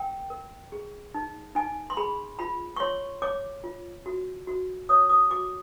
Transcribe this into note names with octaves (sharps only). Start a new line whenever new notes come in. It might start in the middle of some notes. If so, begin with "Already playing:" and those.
Already playing: A#4 G5
A#4
G#4
D#4
D#4 G#5
C6
G#4 B5
F4 B5
C#6
C#5 C6
C#5 D6
F4
F#4
F#4
C#5 D#6
D#6
F#4 D6